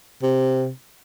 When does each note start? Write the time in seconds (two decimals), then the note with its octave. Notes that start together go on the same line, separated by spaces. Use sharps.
0.22 C3